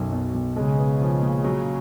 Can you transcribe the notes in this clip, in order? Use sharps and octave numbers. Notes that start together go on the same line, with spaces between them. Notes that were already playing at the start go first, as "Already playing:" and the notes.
Already playing: B1 F#2 F#3
B2
B1
C#3 G#3
B3
F3
A#2
F#3